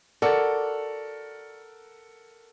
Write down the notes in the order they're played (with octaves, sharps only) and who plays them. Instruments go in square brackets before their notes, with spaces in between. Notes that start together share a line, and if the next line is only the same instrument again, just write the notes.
[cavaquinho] F#4 [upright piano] A4 A#4 F#5 [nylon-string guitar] D5